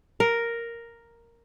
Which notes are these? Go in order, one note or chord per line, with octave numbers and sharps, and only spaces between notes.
A#4